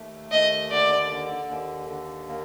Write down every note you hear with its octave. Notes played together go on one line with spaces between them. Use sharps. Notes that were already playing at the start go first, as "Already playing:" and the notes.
Already playing: D#2 A3
D#2 D#5
D3 D5
D3
D#2
D3
A#3